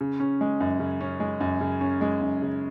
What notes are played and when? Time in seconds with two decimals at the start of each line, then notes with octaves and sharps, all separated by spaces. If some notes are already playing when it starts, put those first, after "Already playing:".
0.01 C#3
0.20 C#4
0.41 G#3
0.60 F#2
0.80 C#3
1.01 C#4
1.20 G#3
1.40 F#2
1.61 C#3
1.81 C#4
2.01 G#3
2.21 F#2
2.42 C#3